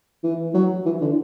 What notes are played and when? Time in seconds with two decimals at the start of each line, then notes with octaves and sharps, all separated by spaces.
0.24 E3
0.54 F#3
0.85 E3
1.01 D3